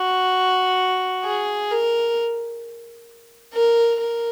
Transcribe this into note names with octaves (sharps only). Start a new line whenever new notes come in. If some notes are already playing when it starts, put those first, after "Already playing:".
Already playing: F#4
G#4
A#4
A#4
A#4